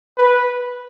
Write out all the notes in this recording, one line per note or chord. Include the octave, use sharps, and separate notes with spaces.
B4